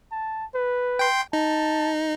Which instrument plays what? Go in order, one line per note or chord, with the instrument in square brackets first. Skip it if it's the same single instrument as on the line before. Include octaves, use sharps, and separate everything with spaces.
[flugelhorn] A5
B4
[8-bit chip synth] G5 C6
[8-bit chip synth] D#4 [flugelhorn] A5